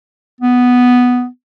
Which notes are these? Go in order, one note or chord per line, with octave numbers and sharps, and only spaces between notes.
B3